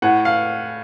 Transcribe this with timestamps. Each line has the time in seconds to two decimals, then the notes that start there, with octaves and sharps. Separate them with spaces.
0.02 A2 F#5
0.25 F5